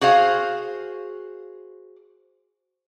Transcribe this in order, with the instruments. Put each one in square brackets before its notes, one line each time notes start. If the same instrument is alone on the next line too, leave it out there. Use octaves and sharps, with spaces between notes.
[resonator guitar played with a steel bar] F#4 G#4 C5 F5